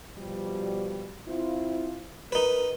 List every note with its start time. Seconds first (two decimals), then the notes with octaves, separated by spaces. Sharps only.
0.18 B2 F3 G3
1.28 C4 E4 F4
2.32 D#4 A#4 B4